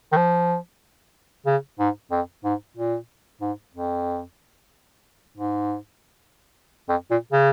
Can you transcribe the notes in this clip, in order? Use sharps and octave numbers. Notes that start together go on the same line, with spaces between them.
D#3
F3
C#3
G#2
F2
G#2
A#2
G#2
F2
G#2
F2
A#2
C#3